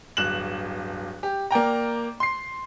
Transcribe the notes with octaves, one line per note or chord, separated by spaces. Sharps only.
D1 G1 F#6 E7 F#7
G4
A#3 D5 G5 A#5
C6 C7